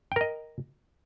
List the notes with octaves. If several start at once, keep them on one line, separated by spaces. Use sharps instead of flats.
A#4 D#5 G5